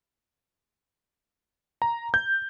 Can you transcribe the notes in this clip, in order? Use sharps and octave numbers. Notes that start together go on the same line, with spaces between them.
A#5
G6